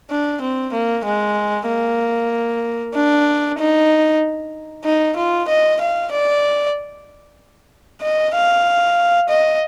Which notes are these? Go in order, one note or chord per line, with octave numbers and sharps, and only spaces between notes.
D4
C4
A#3
G#3
A#3
D4
D#4
D#4
F4
D#5
F5
D5
D#5
F5
D#5